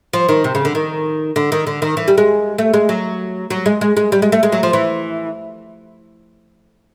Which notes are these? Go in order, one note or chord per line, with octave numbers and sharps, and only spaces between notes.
F3
D#3
C3
C#3
D3
D#3
D3
D#3
D3
D#3
E3
G3
G#3
A3
G#3
F#3
F#3
G#3
G#3
G#3
G3
G#3
A3
G#3
F#3
F3
E3